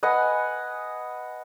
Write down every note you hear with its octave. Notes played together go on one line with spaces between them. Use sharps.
B4 D#5 F#5 G#5